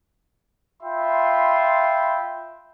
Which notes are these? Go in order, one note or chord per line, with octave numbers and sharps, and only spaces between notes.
F4 E5 G5 B5 C6